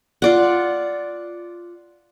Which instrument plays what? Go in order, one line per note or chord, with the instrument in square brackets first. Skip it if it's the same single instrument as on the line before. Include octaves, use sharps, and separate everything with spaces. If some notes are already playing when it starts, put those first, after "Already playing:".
[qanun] F4 D5 F#5